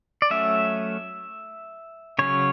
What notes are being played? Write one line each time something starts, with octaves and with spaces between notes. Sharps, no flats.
D5
F#3 A3 C#4 E5
C#3 F#3 C#4 C#5